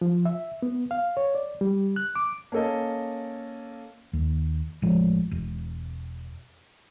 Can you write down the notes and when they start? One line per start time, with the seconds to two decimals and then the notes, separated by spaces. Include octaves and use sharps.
0.01 F3
0.25 E5
0.62 B3
0.91 F5
1.17 C#5
1.35 D5
1.61 G3
1.96 F#6
2.15 D6
2.52 A#3 C#4 A4 D#5
4.13 D#2
4.82 A1 F3 G#3
5.31 E1